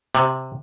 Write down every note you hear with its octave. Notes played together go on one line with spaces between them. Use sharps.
C3